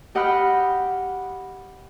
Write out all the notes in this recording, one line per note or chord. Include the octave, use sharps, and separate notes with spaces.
G4 D#5 F#5 G5 B5 F6